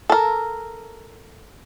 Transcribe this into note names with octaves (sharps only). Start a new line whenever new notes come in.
A4 A#4